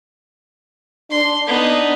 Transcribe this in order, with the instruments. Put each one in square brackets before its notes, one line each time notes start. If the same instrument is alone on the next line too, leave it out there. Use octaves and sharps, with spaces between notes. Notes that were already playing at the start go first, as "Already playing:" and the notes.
[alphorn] D4 [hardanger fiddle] C6
[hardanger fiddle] B3 D#4